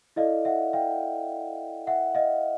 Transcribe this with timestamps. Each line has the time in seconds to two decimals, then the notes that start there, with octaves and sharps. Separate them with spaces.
0.16 E4 A4 D5 D#5 F5
0.45 E5 F#5
0.73 F5 G5
1.87 E5 F#5
2.15 D#5 F5